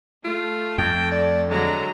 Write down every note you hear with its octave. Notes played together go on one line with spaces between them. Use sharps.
A3 F4
F2 G5
D5
D3 F#3 G#3 A#5